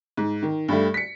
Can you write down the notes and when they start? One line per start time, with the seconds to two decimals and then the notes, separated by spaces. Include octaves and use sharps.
0.17 G#2
0.43 D#3
0.68 G2 G3 A3
0.94 B6 C#7